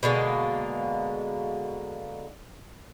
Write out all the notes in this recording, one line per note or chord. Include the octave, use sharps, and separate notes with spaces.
B2 D3 G#3 A#3